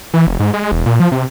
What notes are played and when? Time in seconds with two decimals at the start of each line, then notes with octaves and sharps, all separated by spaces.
0.14 E3
0.27 F1
0.40 G#2
0.54 G#3
0.72 E1
0.86 A#2
1.00 F3
1.12 C3